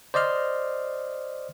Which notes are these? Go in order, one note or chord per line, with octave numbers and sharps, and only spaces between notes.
C5 D5 D#5 C6 F6